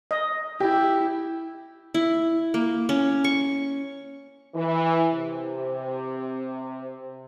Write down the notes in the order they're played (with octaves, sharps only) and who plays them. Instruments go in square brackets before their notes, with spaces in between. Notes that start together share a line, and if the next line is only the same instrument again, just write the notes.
[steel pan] D#5
[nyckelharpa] E4 [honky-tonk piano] G4 [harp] G5
[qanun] E4
A#3
C#4
C#6
[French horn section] E3
C3